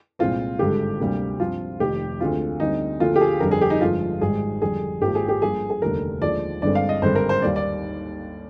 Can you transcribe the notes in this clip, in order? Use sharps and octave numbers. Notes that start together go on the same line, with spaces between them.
C2 A#2 G#3 C4 F4
G#1 G2 D3 G#3 G4
D2 C3 G3 A#3
G2 F3 C4 F4
F1 F2 D#3 G4
D2 D3 G#3 C4 F4
D2 D3 G3 C4 D#4
D2 D3 F3 A#3 F4
G4
G#4
G1 F2 D3 G3 C4 A#4
G#4
G4
D#4
G1 F2 D3 G#3 F4
G#1 G#2 G3 G#4
F2 D3 G3 G#4
G#1 G#2 F3 A#3 G4
G#4
G4
G2 F3 A#3 G#4
G#4
F1 D#2 D3 G3 A#4
D#2 D3 F3 G#3 D5
G1 G2 D3 G#3 C4 D5
F5
D#5
G#1 G2 D3 G#3 C4 C5
A#4
C5
D#2 D3 G3 A#3 D5
D5